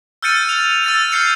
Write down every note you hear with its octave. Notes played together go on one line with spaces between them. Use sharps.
E6 F6 G6 A6 C#7 D#7
F7
E6 A6 D#7
F6 G6 A6 C7 C#7 F7